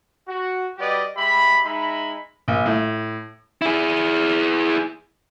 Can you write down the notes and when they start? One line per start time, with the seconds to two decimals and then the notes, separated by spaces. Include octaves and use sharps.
0.27 F#4
0.78 G3 F#4 G4 B4 D5 D#5
1.17 G#3 G4 E5 B5
1.65 G#3 D#4 E5 B5
2.48 A#1
2.66 A2
3.62 E4 G#4